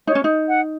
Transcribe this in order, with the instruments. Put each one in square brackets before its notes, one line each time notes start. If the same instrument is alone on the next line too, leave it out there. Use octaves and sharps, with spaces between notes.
[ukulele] D#4 [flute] C#5
[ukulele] C#4
D#4
[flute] F#5